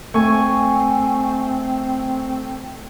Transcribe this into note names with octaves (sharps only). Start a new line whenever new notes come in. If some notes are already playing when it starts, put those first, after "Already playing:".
A3 C4 G#5 C#6